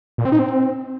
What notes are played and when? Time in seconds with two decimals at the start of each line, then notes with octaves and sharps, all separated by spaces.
0.18 A#2
0.25 C4
0.32 D#4
0.39 C4